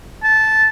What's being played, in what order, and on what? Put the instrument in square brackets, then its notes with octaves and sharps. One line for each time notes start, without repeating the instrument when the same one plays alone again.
[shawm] A5